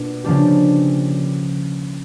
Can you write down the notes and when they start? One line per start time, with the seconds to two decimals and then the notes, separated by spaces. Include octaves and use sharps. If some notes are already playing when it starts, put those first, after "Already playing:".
Already playing: B2 A#3 D4 F4
0.24 C#3 F3 A#3 D4 G4